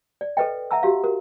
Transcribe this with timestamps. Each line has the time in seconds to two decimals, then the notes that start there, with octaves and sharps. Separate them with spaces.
0.21 D5
0.37 A4 B4 D#5 G5
0.71 E5 F#5 A5 A#5 E6
0.83 F#4 G4 F5
1.04 A#4